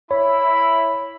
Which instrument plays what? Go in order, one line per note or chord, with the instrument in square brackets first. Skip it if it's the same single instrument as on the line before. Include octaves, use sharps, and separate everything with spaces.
[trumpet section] E4 B5 [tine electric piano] C#5